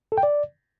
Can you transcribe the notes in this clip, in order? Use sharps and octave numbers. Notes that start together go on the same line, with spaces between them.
A4
G5
D5